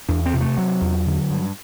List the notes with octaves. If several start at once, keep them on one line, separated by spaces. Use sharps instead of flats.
E2 D4
C4
C3
A3
C3 F#3
E2
D3
G2